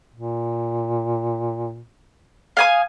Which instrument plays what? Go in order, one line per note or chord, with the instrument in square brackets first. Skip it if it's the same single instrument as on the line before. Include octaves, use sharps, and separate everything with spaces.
[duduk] A#2
[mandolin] F5 G#5 D#6